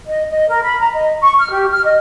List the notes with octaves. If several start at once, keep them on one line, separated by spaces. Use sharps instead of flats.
D#5
D#5
A#4
B5
A#5
D#5
C#6
F6
G4
F6
D#5